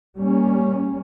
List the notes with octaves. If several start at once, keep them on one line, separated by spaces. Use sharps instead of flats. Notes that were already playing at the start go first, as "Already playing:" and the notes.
G3 A#3 C#4